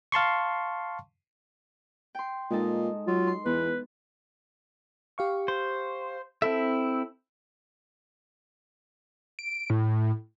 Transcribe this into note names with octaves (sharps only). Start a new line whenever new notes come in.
F5 A5 C6 C#6
G5 C6
A#2 G#3 D#4 A4
F#3 F4
C6
E2 B3 B4
G4 F5 C#6
C5
C4 E4 A4 E5
D7
A2